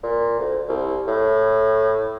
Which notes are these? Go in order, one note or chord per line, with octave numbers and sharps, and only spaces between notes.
A#2
D2
C2
A2